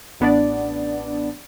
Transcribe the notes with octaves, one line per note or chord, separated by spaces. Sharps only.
A1 B3 D4 D5